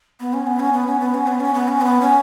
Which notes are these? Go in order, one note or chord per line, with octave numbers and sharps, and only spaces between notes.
B3
C#4
B3
C#4
B3
C#4
B3
C#4
B3
C#4
B3
C#4
B3
C#4